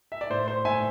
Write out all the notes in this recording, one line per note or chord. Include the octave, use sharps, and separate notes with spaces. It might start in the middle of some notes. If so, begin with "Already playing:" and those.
E5
D5
A2 C5
C5
A2 E5 G#5